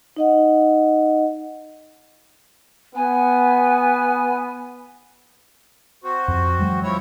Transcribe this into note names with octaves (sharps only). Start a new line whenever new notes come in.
D#4 D#5 F#5
B3 G#5
C4 F#4
F2
E3 F#3 G#3
F3 E4 C#5